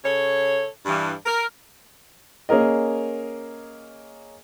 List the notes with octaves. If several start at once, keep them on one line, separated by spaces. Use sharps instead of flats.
C#3 A4 C#5
G2 E3
A#4
A#3 C#4 G#4 A#4 D#5